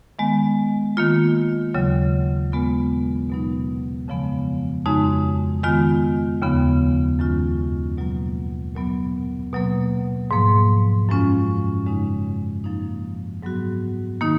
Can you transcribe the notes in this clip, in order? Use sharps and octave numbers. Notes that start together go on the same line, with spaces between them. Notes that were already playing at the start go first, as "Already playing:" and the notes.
D#3 G#3 B3
D#3 A#3 F4
D#2 C#3 F#3
A#2 G#3 B3 F4
B2 F#3 B3 D#4
F2 C#3 F3 G#3 B3
F2 C#3 G#3 D#4 F#4
D#3 G#3 B3 F4
D#2 C#3 F3 B3
F#2 D#3 G#3 C#4 F4
B2 F#3 A#3
A#2 F#3 B3
B2 F#3 A#3
G#2 F3 A#3
F#2 F3 G#3 C#4 F4
F#2 C#3 G#3 D#4
F#2 F3 A#3 D#4
G#2 F#3 B3 F#4
D#3 A#3 D#4